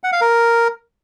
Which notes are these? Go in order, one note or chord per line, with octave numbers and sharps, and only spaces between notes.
F#5
F5
A#4